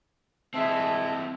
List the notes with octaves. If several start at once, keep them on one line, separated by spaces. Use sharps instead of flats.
E3 G#3 C4 E5 A5